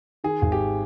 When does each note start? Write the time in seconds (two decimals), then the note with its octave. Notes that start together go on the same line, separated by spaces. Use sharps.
0.24 D#3 G#4
0.42 G#1
0.52 G4